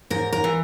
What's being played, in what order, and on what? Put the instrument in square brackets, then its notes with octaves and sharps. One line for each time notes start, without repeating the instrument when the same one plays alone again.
[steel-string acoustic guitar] G#2 A#4
A#4
E3